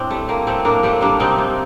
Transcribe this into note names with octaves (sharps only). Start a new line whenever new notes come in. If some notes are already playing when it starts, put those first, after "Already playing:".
Already playing: A2 C4 D4
G3 A3
G3 A#3
A2 A3 C4
A2 A#3 D4
G3 A3 C4
G3 A#3 D4
C3 C4 D#4
C3